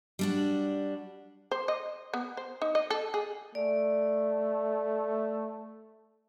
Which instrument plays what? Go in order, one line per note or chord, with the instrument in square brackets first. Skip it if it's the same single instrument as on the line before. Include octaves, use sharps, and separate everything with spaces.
[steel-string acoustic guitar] G3 D4 F#4
[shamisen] C5
D#5
B3
C5
D#4
D#5
A4
G#4
[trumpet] A3 [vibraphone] D5